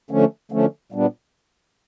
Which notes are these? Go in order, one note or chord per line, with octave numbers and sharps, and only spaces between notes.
D3 F3 A3 C#4
D3 F3 A3 C#4
A#2 G3 B3 D4